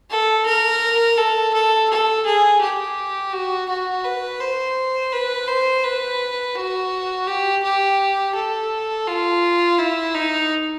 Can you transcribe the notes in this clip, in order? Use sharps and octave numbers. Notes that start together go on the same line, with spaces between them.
A4
A#4
A4
A4
A4
G#4
G4
F#4
F#4
B4
C5
B4
C5
B4
F#4
G4
G4
A4
F4
E4
D#4